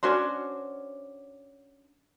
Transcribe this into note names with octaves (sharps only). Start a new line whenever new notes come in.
C#4 D4 F#4 C5